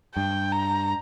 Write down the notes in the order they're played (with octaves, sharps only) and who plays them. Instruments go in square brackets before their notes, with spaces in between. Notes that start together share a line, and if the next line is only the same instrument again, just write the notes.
[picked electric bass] G2 [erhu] G5
[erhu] A#5